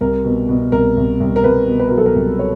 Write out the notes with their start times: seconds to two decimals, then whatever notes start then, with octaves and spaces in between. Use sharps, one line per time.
0.01 C2 A#4
0.25 B2
0.49 B2
0.72 C2 A#4
0.97 C2
1.20 C2
1.36 A#4
1.44 C2 B4
1.67 B2
1.80 B4
1.88 F#3 A#4
1.98 A4
2.06 A#4
2.16 C2
2.39 C#5